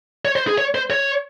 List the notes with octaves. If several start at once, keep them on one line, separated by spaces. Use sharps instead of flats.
C#5
C5
G#4
C#5
C5
C#5